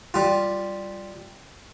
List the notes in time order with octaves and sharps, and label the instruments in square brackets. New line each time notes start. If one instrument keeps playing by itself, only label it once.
[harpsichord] G3 F4